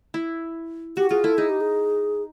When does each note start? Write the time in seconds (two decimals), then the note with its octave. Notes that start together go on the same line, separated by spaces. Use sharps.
0.14 E4
0.97 F#4 G4
1.10 F4 G#4
1.24 E4 A4
1.37 D#4 G#4
1.49 G4
1.60 G#4